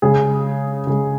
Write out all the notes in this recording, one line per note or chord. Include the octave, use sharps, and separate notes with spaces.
C#3 G#3 G#4
C#3 G#3